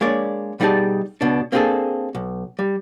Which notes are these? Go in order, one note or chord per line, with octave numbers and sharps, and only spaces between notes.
G#3 A#3 D4 C#5 D5
B2 G3 D#4 G#4 D5 A5
C#2 B2 D4
A#3 C4 D4 F#4 G#4 A4
B1
G3